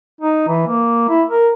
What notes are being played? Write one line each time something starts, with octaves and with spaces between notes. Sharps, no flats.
D#4
E3
A#3
E4
A#4